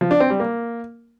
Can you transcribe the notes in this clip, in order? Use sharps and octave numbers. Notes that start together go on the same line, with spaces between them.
F3
D4
C4
G3
A#3